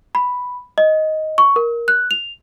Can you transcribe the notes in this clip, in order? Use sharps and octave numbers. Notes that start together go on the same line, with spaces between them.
B5
D#5
C#6
A#4
F#6
F7